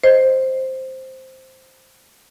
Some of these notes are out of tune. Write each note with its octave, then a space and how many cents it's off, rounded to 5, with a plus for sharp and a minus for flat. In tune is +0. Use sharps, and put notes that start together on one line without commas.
C5 +0 D#5 +0